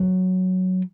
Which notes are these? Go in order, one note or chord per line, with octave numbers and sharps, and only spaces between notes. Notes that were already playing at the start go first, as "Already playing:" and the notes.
Already playing: F#3